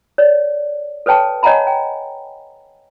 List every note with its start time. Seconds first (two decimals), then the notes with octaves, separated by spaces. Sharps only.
0.18 C#5 D5
1.06 A4 B4 C#5 G5 A5
1.43 C#5 D#5 F#5 G#5 A#5 B5
1.67 G5